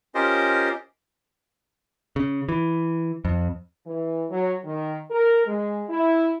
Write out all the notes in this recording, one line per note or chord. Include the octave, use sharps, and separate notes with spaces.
C#4 F4 G4 A#4 C5 D#5
C#3
E3
F2
E3
F#3
D#3
A#4
G#3
E4